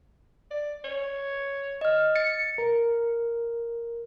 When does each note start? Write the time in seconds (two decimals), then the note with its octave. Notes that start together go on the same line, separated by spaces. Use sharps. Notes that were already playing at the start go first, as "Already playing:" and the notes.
0.51 D5
0.85 C#5
1.81 D#5 F6
2.16 A6 C#7
2.58 A#4